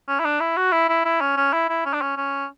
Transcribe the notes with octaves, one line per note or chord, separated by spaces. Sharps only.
C#4
E4
D4
E4
F#4
E4
E4
E4
C#4
C#4
E4
E4
C#4
D4
C#4
C#4